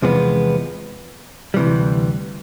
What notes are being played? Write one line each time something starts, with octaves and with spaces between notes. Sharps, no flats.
E2 C3 F3 G#3 B3
D2 C3 E3 G3